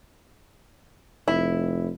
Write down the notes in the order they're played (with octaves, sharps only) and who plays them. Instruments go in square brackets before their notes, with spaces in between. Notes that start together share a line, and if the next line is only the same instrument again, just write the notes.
[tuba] F1 [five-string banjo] E4